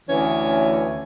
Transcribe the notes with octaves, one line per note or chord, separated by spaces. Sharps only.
D2 E3 C#4 C#5